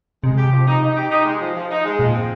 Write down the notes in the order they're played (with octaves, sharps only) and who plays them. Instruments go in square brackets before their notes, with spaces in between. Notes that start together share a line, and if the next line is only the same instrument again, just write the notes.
[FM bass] C3 [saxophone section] G#3
[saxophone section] G4
F3
D#4
D#4
G4
D#4
G#3
F3
F3
D#4
G#3
[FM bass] A#2 [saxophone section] F3
[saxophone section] C4